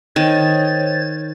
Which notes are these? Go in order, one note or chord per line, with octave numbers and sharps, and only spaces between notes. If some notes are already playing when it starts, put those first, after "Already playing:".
D#3 C5 C#5 A6